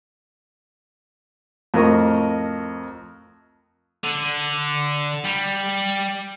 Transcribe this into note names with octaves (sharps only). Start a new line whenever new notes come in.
F2 A2 A#4 D#5 C#6
D3
G3